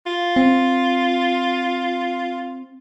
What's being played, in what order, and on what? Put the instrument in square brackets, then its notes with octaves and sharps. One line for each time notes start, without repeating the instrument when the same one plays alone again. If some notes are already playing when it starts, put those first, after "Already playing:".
[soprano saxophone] F4
[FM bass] C4